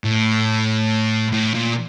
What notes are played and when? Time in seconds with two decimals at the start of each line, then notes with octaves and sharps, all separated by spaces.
0.05 A2
1.32 A2
1.54 A#2